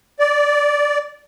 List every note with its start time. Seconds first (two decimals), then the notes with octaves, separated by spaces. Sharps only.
0.19 D5